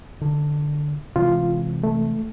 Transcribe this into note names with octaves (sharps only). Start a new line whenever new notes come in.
D3
C3 E3 G#3 F4
A3